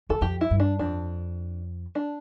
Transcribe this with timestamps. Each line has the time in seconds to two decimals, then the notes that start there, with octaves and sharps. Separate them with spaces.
0.09 E2 A4
0.21 F2 G4
0.41 E4
0.51 G2
0.60 D4
0.79 F2 D4
1.95 D4